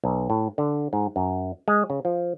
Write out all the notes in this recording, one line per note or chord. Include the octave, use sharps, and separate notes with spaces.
B1
A2
D3
G#2
F#2
G#3
C#3
F3